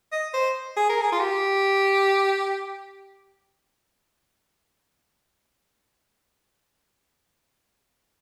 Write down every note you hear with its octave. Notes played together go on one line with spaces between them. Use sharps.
D#5
C5
G#4
A#4
G#4
F4
G4